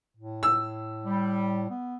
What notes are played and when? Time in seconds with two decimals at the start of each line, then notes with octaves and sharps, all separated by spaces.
0.17 A2
0.43 E6
1.05 G3
1.70 B3